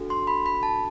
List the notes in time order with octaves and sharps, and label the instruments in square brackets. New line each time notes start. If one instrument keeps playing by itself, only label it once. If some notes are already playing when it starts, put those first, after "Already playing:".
Already playing: [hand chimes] D4 F#4 A4
C6
B5
B5
A5